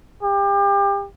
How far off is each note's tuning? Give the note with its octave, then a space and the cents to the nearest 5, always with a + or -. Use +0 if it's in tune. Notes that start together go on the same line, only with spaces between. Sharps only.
G4 +30